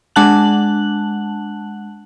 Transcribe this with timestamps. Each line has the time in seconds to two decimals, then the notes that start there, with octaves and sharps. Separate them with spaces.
0.16 G#3 D4 F#5 A5 F#6 F#7